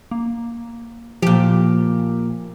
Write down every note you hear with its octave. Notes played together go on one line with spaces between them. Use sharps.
A#3
A#2 F3 G4